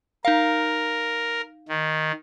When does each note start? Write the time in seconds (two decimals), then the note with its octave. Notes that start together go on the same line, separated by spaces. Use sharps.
0.25 D#4 A#4 F5
1.69 D#3